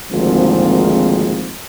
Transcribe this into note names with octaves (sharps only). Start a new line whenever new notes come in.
G#1 D2 G#2 F3 A#3 C4